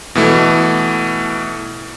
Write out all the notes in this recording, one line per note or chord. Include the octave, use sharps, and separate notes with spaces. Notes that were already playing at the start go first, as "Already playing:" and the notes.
B2 E3 A3